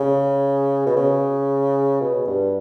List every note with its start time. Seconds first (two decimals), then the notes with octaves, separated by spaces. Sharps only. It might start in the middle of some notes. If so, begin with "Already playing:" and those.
Already playing: C#3
0.87 B2
0.97 C#3
2.01 B2
2.27 G2